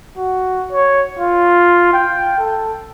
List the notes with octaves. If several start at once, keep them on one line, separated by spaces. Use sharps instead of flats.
F#4
C#5
F4
G5
A4